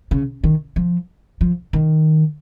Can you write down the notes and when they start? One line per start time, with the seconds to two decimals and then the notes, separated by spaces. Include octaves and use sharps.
0.11 C#3
0.44 D#3
0.76 F3
1.41 F3
1.73 D#3